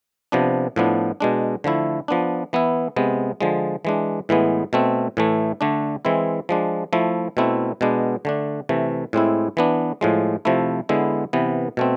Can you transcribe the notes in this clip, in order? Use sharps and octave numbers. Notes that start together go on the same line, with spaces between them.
C3 F3 B3 D4
A2 F3 B3 D4
B2 G#3 D4
D3 F3 A3 E4
F3 B3 D4
E3 B3 E4
C3 G#3 B3
D3 F3 G#3
E3 G#3 D4
A2 E3 G#3 B3
B2 A3 C4
A2 E3 A3
D3 A3 D4
E3 G#3 C4 E4
F3 G#3 D4
F3 A3 E4
B2 A3 C4 E4
B2 G#3 B3 D4
D3 A3 D4
C3 E3 A3
A2 G#3 C4 E4
E3 B3 D4
A2 F3 G#3
C3 F3 A3 E4
D3 G#3 B3 E4
C3 E3 B3
B2 A3 C4